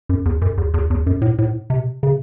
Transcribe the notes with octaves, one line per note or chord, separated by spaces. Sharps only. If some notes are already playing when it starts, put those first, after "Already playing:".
F#2
E2
F#2
E2
E2
E2
F#2
A2
A2
C3
C#3